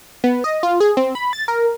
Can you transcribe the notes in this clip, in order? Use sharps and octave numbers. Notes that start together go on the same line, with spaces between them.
B3
D#5
F4
G#4
C4
B5
A6
A#4